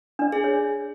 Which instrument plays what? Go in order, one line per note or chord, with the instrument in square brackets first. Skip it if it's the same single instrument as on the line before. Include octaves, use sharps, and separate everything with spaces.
[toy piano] D4 D5
[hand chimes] G#4
[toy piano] C#5